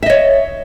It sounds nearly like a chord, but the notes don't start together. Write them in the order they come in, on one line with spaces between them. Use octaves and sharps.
E5 D#5 C#5